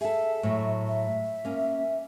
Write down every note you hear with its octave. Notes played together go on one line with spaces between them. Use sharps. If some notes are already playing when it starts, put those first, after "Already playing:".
G#4 A4 E5
A2 F#3
E5
A#3 C#4